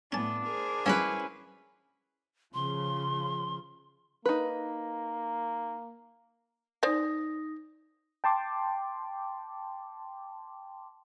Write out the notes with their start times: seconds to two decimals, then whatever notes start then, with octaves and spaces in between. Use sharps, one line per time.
0.12 A2 B3 C#4 D4 A5
0.46 G#4 A#4 C5
0.86 F#2 C#3 F3 C#4 E4 B4
2.54 C#3 F3 C6
4.26 A#3 D#4 B4
6.83 D#4 C5 D5 G#5 D#6 A#6
8.24 G5 A5 C6 D6